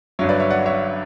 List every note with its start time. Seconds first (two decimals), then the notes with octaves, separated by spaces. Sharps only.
0.19 G1 G2 F#3 C#5 E5
0.29 B4 D5
0.40 C#5 E5
0.50 D5 F#5
0.66 C#5 E5